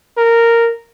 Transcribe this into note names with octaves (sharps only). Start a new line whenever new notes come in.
A#4